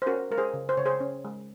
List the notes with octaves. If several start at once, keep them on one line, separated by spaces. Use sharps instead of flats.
C5
C#4 F#4 A#4
G#3 A#4
G#4 C5
C#3
C5
C#3 C#5
G#4 C5
C#4
G#3